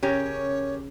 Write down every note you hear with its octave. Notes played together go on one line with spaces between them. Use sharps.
C#3 C#4 G4 A#4 C#5